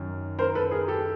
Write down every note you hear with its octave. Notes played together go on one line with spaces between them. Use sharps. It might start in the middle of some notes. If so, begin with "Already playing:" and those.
Already playing: F#2 D#3
A#4 C5
A4 B4
G#4 A#4
G4 A4